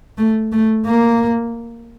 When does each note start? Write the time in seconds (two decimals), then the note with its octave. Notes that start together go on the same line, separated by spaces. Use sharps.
0.18 A3
0.52 A3
0.86 A#3